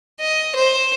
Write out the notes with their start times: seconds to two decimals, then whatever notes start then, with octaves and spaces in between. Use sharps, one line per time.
0.20 D#5
0.56 C5